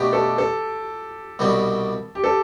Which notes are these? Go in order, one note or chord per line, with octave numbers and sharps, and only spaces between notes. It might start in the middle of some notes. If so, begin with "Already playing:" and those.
Already playing: B2 A3 D4 G4
A4
A4
C2 B2 G3 C4
G4
A4